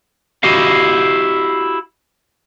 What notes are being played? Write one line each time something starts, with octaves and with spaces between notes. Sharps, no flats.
E4 F#4 G4 D#5 F5